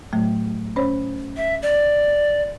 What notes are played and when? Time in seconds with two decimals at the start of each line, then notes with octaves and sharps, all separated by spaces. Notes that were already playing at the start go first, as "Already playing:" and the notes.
0.13 A2 F#3 A3
0.76 C#4 C5 C#5
1.37 E5
1.62 D5